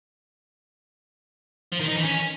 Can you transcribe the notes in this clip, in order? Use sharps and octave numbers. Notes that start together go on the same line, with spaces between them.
F3
D#3
D#4
E3
C#4